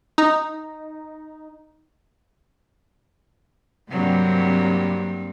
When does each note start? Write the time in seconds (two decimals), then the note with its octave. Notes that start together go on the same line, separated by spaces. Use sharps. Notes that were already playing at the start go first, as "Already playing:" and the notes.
0.18 D#4
3.90 G2 C3 F#3 A#3 C4